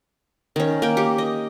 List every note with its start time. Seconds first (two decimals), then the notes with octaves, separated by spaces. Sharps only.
0.56 D#3 C#4
0.82 A#3 G5
0.97 G4
1.18 D#5